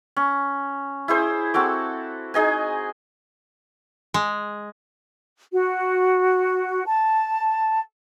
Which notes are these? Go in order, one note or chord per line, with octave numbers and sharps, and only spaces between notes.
C#4
E4 G#4 C5
C4 F#4 A4 D6
D#4 G#4 D#5 G#5
G#3
F#4
A5